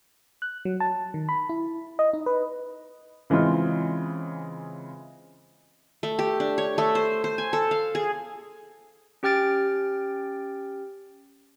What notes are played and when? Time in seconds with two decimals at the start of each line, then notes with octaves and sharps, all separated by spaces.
0.42 F#6
0.65 F#3
0.80 A5
1.14 D#3
1.29 B5
1.49 E4
1.99 D#5
2.13 D#4
2.26 B4
3.30 C#3 E3 G#3 C4 F4
6.03 A3
6.19 G4
6.40 D4
6.58 C#5
6.78 A3
6.95 C5
7.24 C5
7.38 G#5
7.53 A4
7.71 F5
7.95 G#4
9.23 C#4 G4 G5 F6 A6 D7